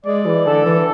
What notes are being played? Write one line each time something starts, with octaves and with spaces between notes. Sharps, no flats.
G#3 D5
E3
D3 A4
E3